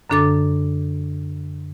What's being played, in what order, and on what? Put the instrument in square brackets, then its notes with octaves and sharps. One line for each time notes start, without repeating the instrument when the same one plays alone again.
[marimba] F#2 D3 D4 A4 D6 A6